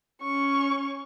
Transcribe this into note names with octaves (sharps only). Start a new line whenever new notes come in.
C#4 C#6